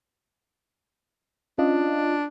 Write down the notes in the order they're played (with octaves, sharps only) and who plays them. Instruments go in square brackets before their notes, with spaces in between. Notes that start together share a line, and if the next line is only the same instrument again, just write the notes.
[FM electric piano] C#4 F4 D#5 [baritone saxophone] D4